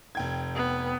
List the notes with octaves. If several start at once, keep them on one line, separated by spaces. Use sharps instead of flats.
F1 G5 G#6
B3